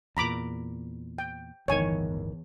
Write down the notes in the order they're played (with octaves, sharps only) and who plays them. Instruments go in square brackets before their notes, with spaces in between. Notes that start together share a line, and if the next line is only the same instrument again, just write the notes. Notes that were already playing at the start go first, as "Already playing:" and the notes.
[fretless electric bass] E2 A#2 [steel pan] A#5 B5 D6
[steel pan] G5
[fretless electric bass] D1 G1 D#3 [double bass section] E2 [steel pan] C#5 G#5